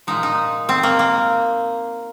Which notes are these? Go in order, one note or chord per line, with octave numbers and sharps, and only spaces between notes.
A#2 F3 G#3 D#4
D#4
C4
A#3
A#3